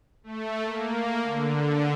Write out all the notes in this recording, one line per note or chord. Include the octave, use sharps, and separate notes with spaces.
A3
A#3
D3